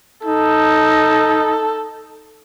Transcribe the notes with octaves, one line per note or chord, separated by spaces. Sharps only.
D#4 A4